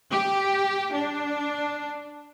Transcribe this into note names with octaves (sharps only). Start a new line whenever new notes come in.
G4
D4